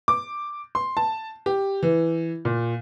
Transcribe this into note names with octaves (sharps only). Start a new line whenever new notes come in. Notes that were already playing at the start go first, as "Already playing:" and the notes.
D6
C6
A5
G4
E3
A#2